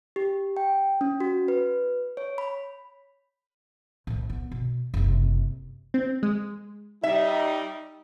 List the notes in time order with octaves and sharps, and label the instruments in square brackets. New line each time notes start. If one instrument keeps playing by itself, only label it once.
[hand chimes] G4
G5
C#4
F#4
B4
C#5
B5
[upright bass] A2 D#3
B3
B2
F#1 C3
[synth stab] C4
G#3
[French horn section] G3 D#4 [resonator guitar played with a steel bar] E5